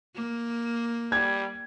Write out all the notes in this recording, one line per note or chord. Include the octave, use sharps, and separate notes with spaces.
A#3
G3 G#6